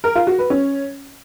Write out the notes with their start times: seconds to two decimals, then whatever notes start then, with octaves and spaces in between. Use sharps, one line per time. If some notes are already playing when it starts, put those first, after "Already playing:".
0.04 A#4
0.15 F4
0.27 F#4
0.39 B4
0.50 C#4